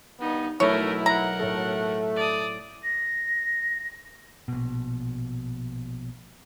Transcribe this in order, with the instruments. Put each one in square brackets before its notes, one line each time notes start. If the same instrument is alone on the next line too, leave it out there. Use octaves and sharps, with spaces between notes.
[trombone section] G2 D#3 B3 [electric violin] D#4
[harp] B1 [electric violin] A3 A#4 [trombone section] E4 [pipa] C#5
[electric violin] A#4 F#5 [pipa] A#5
[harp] A2 A4 [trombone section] A3
[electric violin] D5 D#6
[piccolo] A#6
[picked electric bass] A#1 B2